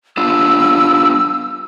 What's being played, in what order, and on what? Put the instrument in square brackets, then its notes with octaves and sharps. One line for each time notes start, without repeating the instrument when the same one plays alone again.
[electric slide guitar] B3 D4 F4 [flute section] E6